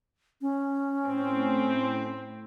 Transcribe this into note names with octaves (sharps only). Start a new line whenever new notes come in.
C#4
A2 C4